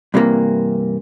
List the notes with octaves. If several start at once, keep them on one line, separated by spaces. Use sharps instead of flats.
G2 C3 E3 G#3 A#3